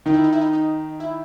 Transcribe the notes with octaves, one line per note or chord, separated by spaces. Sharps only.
D#3 D#4
E4
D#4
E4
D#4
D#4
E4